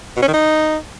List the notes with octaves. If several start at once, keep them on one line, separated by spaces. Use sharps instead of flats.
B2
C#4
D#3
D#4